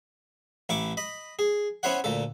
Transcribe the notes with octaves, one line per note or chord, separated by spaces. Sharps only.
A1 E4 C#6 D6
D#5 B5
G#4
B3 C#4 E4 C5 C#5 F#5
D2 A#2 A4